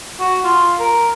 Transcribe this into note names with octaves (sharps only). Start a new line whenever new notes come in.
F#4
F4
A#4